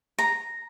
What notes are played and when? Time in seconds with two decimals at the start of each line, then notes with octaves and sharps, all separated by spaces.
0.19 A#5